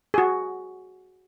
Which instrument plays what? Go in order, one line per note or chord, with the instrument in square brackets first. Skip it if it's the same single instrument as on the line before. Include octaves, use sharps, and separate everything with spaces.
[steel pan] F#4 G#4